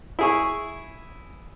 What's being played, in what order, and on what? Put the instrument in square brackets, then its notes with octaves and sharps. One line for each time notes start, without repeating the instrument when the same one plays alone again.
[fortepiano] E4 G#4 C#6